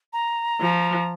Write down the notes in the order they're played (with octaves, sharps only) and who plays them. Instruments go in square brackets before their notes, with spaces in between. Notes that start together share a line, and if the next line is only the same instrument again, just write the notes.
[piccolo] A#5
[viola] F3